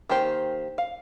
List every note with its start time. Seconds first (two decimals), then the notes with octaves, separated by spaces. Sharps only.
0.09 D#3 A#3 G4 C5
0.78 F5